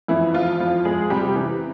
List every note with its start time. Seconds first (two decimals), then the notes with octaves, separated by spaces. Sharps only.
0.08 F2 E3 E4
0.34 F2 F3 F4
0.60 F2
0.85 F2 G#3 G#4
1.10 C3 G3 G4
1.36 E3